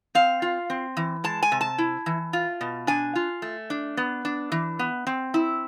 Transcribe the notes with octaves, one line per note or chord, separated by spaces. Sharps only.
C4 F5
F4
C4
E3
G#3 A5
G#5
C3
A5
E4
E3
F4
B2
D4 G#5
F4
A3
D4
B3
D4
E3
B3
C4
E4